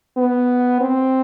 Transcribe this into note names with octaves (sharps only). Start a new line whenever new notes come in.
B3
C4